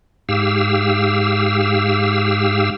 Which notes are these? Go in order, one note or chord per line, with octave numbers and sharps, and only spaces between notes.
G#2 G4 F5 E6